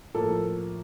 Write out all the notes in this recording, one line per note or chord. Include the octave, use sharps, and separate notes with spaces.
A2 F3 A#3 A4